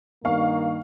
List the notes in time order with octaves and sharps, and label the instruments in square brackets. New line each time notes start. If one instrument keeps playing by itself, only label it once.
[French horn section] G2 D#3 A#3 [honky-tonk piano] F5 C#6